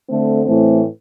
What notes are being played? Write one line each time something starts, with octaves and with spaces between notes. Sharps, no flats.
D3 A3 C4
A2 E3 A3 C4